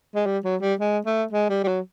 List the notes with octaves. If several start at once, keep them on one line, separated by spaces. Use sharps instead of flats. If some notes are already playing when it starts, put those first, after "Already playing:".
G#3
G3
F#3
G3
G#3
A3
G#3
G3
G3
F#3